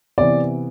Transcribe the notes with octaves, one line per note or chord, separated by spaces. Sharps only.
C3 E3 B3 D5